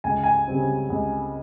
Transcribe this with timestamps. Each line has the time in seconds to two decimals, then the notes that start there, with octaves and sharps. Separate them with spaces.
0.04 C#2 G#5
0.23 G#5
0.48 C#3 G3 C4
0.90 C#2